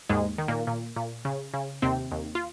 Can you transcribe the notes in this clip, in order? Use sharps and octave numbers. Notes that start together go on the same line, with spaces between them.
D#2 G#2 G#3
D#3
A#2 A#3
A#2
A#2
C#3
C#3
D#2 C3 C4
D#2
F4